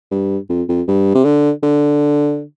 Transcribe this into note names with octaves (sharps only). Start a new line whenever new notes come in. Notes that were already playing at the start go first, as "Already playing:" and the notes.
G2
F2
F2
G2
C3
D3
D3